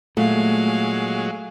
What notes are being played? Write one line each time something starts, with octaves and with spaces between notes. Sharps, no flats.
A#2 F#3 G#3 A3 F5